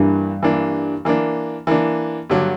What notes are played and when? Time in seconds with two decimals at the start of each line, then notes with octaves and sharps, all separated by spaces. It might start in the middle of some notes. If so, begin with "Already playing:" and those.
Already playing: G2 E3 A#3 D4
0.43 E3 A#3 D4
1.05 E3 A#3 D4
1.67 E3 A#3 D4
2.30 G2 D3 F#3